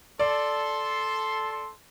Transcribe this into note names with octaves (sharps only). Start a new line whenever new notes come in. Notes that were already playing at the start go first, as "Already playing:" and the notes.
A4 D5 C6